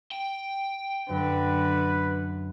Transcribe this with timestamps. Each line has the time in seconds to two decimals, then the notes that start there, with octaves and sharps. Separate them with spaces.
0.11 G5
1.10 F#2 D3 B4